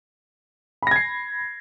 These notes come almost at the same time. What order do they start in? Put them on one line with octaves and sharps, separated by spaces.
B5 A#6 G#6 C7